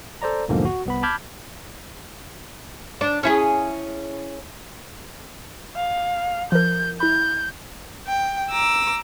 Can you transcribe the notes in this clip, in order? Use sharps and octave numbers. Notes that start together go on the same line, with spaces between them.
A4 C5 D5 A#5
B1 E2 G#2 D3 F3 A#3
F#4
C2 B3 B5
A5 B5 D6 F6 G6 G#6
D4
C#4 E4 G#4
F5
F3 A#4 G6
E4 B5 G6
G5
A#5 D6 E6